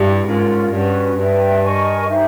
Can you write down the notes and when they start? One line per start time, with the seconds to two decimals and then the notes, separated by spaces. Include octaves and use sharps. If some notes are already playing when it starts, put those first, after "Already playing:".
Already playing: G2 E4 G4
0.26 G#2 C#4 F4 A#4
0.71 G2 C#4 F#4 B4
1.17 G2 B4 E5 G5
1.63 A#4 D#5 G#5 C#6
2.08 D#4 G4 C5 E5